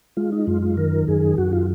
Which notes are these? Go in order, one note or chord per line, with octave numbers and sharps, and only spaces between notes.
G#3 F4
D#4
F#2 F4
F4
D#3 A#4
F#2 G#4
F#2 F#4
F4